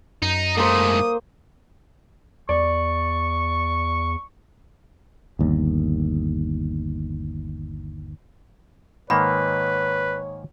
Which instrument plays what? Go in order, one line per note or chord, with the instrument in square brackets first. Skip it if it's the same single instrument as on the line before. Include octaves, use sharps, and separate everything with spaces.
[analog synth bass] F#2 [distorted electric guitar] D#4
[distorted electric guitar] G#2 A3 [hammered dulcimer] A#3 C5 [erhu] D#6
[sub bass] E2 [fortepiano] D5 [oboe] C#6
[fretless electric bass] G1 D#2
[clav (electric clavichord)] G#2 D#3 A#3 [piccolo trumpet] B4 [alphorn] C#5 [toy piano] B5